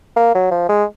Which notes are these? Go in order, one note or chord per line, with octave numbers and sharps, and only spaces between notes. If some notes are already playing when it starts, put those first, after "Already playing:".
A#3
F#3
F3
G#3